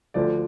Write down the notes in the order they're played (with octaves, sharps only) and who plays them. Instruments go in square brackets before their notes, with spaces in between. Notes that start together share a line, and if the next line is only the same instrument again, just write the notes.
[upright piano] D2 D3 F3 D5